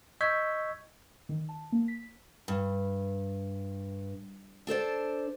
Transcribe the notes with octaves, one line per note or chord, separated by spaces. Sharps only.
D#5 C#6 E6 G6 G#6 B6
D#3
A5
A#3
B6
G2
D4 A4 C5 D5